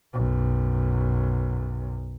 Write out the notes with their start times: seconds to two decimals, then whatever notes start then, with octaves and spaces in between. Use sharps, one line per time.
0.14 B1 F#2